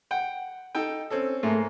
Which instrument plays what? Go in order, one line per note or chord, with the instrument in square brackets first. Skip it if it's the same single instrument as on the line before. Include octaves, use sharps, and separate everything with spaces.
[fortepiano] F#5 G5
D#4 A4 G5
C4 C#4 A4
[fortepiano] G#2 A#3 [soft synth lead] A3